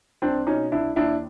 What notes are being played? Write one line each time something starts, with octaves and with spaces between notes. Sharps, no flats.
C2 C4 D4
B2 C#4 D#4
C2 D4 E4
D#2 D4 E4